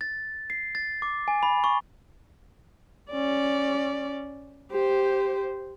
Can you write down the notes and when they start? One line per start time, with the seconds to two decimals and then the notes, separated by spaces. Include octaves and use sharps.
0.01 A6
0.50 C7
0.75 A6
1.02 D6
1.28 G#5
1.43 B5
1.64 C#6
3.11 C#4 D5
4.72 G4 C5